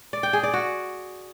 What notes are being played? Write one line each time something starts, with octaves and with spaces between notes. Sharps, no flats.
D5
G5
G#4
D5
F#4